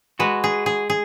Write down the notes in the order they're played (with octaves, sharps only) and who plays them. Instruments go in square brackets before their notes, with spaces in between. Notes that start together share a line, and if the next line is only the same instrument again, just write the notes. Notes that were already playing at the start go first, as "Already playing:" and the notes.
[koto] G#3 [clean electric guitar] F#4 B4
[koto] G#4
G#4
G#4